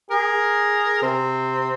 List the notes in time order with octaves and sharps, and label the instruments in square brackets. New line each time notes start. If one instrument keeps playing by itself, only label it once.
[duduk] G#4 [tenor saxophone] A#4
[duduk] C3 [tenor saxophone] C4